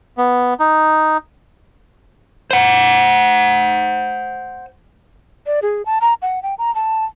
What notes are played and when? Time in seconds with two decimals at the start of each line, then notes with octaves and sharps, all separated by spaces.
0.18 B3
0.60 D#4
2.51 C5 F#5
5.47 D5
5.62 G#4
5.86 A5
6.01 A#5
6.22 F#5
6.43 G5
6.58 A#5
6.75 A5